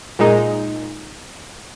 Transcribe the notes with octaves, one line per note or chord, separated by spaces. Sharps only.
A#2 G#3 D#4